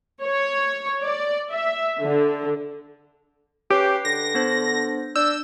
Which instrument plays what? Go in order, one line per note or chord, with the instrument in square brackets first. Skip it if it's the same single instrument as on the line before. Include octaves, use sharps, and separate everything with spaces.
[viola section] C#5
D5
E5
D3
[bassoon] C#4 [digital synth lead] G4 [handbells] B4 G5 C7
[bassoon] D3 [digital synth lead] A#6
[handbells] B3 D4 C5
[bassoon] D4 [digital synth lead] E6 [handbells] G6